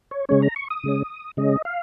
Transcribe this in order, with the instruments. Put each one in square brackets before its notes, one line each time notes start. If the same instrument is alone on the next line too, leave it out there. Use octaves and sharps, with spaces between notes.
[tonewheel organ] C#5
C#3 G#3 C#4 C#5
A#5
C#6
D#6
C#3 G#3 C#4
C#3 G#3 C#4 D#5
F5